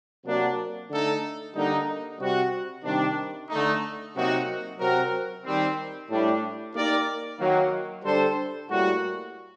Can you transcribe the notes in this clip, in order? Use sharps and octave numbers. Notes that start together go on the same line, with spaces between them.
C3 F#3 A#3 D4 F#4
D3 A3 D#4 A4
D3 G3 A#3 D#4
C3 G3 C4 F#4
C3 D#3 G3 D4
D3 A3 D#4
C3 F#3 A#3 D#4 F#4
C3 F#3 C4 F#4 A#4
D#3 G3 C4
A2 G3 D4
A#3 D#4 G4 A#4 D5
D#3 F#3 A#3
D3 G3 D4 A4 C5
A2 G3 A#3 F#4